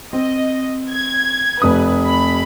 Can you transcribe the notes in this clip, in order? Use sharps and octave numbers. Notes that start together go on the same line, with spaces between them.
C4 D#5
G#6
F1 C3 B4 D#6
B5